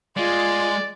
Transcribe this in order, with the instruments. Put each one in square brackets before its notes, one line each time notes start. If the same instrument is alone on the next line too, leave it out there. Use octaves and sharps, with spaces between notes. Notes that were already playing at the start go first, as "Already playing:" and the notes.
[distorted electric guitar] G#3 [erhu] F4 [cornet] D5